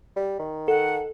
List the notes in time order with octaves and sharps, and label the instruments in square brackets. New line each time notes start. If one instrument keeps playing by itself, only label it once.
[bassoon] G3
D#3
[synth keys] A4 [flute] F#5